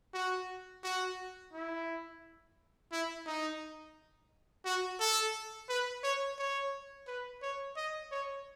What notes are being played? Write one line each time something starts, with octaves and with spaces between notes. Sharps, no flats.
F#4
F#4
E4
E4
D#4
F#4
A4
B4
C#5
C#5
B4
C#5
D#5
C#5